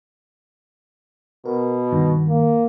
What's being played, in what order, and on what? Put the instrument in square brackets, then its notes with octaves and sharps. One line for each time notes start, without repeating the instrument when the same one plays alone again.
[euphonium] B2 [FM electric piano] A#4
[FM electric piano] G2 D#3
[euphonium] A#3